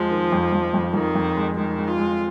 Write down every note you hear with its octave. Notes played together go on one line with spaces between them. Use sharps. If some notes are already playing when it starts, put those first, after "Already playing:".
Already playing: F2 F3 G#3
D#3
F2
F2
F2
F2 D#3
F2
G#3
D#3 G#3
G#3
F4
G#3